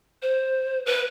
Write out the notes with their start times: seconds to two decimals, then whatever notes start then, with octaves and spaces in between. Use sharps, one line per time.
0.22 C5
0.86 B4